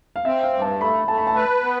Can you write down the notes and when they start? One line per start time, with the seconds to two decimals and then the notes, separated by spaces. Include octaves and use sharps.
0.16 F5
0.25 C4 E5
0.43 F5
0.53 G2
0.62 A5
0.80 A3 B5
1.08 A3 A5
1.18 B5
1.27 A5
1.35 B4
1.62 B3